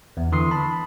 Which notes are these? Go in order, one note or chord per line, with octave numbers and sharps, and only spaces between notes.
E2
D3 E3 C6 D#6 C7
A5 B5